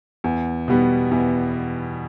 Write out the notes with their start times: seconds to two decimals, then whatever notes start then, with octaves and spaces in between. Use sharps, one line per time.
0.24 E2
0.68 B2 G3 B3
1.11 E2